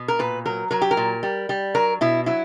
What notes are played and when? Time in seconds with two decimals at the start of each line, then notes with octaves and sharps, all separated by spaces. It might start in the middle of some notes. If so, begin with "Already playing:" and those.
Already playing: B2
0.08 A#4
0.19 A#2 B4
0.45 F#3 A#4
0.71 F#3 A#4
0.82 G4
0.91 A#4
0.97 A#2
1.23 G3
1.49 G3
1.74 F#3 A#4
2.01 B2 E4
2.26 F#3 E4